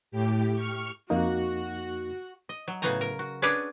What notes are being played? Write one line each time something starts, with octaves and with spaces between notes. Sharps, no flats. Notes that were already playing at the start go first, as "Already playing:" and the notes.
A2 G4
C#6 F6
F2 A#3 D#4 F#4
D#5
F#3
A2 C#3 B3 F#4 G#5 A#5
A#4
F#4
C#4 D4 G#4 B4 C#5 D5